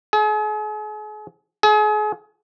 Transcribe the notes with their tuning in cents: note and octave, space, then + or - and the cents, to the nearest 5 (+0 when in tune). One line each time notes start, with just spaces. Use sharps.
G#4 +40
G#4 +35